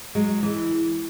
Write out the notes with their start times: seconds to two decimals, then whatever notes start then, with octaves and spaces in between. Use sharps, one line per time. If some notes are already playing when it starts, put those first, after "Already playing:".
0.15 F#3 G#3
0.43 E3